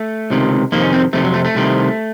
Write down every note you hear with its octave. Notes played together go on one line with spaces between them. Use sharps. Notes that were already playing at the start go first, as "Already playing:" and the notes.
Already playing: A3
C#2 C3 D#3
F2 C3 D#3 A#3
C#4
C4
F2 C3 D#3 A3
F#3
A3
A3
C2 C3 D#3